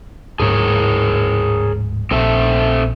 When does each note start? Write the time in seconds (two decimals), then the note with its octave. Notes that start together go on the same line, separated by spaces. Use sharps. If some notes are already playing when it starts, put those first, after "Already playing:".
0.40 D1 G#2 G#4 A#4 C#5
2.11 A#1 C4 A4 E5